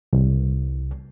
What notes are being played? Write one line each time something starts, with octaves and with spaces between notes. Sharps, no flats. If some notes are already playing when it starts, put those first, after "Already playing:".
C2